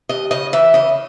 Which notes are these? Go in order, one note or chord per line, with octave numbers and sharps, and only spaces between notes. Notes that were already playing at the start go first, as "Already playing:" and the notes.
D#2 D#5
C#3 D#5
E3 E5
C#3 D#5